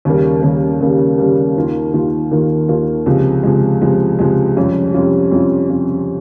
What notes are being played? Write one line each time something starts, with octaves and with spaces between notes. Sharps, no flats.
D#2 C#3 G3 A#3
D#2 C#3 G3 A#3
D#2 C#3 G3 A#3
D#2 C#3 G3 A#3
D#2 D#3 A#3 F4
D#2 D#3 A#3 F4
D#2 D#3 A#3 F4
D#2 D#3 A#3 F4
C#2 C3 F3 G#3
C#2 C3 F3 G#3
C#2 C3 F3 G#3
C#2 C3 F3 G#3
F2 C3 G3 C#4 F4
F2 C3 G3 C#4 F4
F2 C3 G3 C#4 F4
F2 C3 G3 C#4 F4